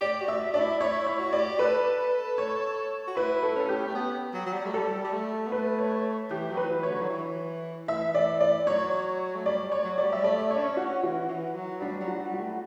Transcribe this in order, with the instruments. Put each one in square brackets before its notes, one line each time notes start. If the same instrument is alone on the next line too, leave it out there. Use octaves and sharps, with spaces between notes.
[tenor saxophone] G4 [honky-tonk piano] D5
[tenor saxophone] F#4
[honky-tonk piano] E5
[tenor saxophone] D4 [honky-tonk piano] D5
[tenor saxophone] E4
[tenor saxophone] E4 [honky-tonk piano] C#5
[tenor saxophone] E4
[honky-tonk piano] C#5
[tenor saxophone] F#4
[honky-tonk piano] D5
[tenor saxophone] G4
[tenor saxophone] A4 [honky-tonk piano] B4
[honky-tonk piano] C#5
[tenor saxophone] F#4
[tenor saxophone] E4 [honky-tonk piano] B4
[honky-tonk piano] A4
[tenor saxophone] C#4 [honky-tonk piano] A4
[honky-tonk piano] G4
[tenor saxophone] A3
[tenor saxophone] B3 [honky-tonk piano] G4
[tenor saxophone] F#3
F#3
G3
A3
[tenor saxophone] G3 [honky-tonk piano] A4
[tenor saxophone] G3
A3
B3
[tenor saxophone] A3 [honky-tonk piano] B4
[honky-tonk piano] C#5
[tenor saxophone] E3 [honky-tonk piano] G4
[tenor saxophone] F#3
[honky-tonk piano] B4
[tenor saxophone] E3
[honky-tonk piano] C#5
[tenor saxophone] D3
F#3
E3
[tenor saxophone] E3 [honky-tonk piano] E5
[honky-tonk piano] D5
D5
[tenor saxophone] F#3 [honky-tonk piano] C#5
[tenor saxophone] A3
[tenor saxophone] G3 [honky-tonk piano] D5
[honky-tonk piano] C#5
[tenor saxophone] F#3
[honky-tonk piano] D5
[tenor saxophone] G3
[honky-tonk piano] E5
[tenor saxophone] A3 [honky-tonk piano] D5
[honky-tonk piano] C#5
[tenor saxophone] D4
C#4
[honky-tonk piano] F#4
[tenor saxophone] E3 [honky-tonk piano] F#4
[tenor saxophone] E3
F#3
[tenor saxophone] G3 [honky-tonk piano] D4
[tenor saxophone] F#3
[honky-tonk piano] F#4
[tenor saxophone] G3
[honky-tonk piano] F#4
[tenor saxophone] A3